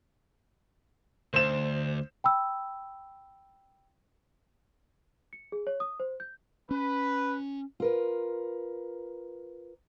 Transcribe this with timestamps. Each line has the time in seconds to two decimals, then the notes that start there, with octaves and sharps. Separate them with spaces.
1.34 D2 C5 E7
2.24 G5 B5 E6
5.33 C#7
5.52 G#4
5.67 C#5
5.80 D#6
6.00 C5
6.20 G6
6.71 C#4 B4
7.80 F4 A#4 B4